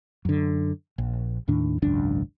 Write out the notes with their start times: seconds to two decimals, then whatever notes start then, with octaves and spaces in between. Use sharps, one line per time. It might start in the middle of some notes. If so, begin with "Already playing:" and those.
0.25 F#2 D3
0.98 A#1
1.48 D#2 A2 D#3 D4
1.82 G#1 C#2 F#2 D4